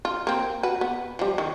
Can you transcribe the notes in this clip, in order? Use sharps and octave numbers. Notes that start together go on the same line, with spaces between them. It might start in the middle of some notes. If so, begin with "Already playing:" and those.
F4
A#3 C4
F#4 B4
B3
F3 G3
D#3